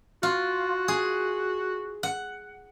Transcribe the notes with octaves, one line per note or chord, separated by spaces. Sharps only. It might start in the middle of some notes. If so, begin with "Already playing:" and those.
F4 F#4
G#4
F#5